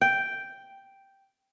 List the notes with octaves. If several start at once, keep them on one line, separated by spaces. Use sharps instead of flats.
G5